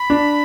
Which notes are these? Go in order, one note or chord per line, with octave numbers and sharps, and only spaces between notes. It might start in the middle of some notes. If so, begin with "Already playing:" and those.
Already playing: B5
D4